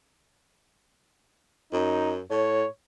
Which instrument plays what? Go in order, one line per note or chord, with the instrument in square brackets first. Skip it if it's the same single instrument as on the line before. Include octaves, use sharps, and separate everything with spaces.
[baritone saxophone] F#2 [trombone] D#4
[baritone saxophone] A2 [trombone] C#5